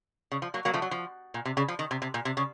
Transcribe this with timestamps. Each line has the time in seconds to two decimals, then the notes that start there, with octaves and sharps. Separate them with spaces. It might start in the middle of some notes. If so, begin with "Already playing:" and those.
0.32 C#3
0.42 F3
0.54 F#3 A#3
0.65 F#3 A#3
0.74 F3 A3
0.82 F#3
0.91 F3
1.34 A#2
1.45 C3
1.57 C#3
1.68 F3
1.79 D#3
1.91 C3
2.02 C3
2.14 A#2
2.25 C3
2.37 C#3